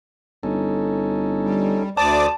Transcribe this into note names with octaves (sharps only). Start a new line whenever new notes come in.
G1 C#4 D#4 A4
G3
D2 C5 D5 A5 D6 D#6